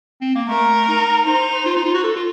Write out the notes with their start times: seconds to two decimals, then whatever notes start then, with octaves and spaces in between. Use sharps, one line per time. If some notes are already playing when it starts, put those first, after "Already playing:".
0.21 C4
0.35 A#3
0.48 A3 A#4
0.88 D#4
1.26 D#4 C5
1.66 F4
1.76 D#4
1.85 F4
1.94 F#4
2.04 A4
2.16 F4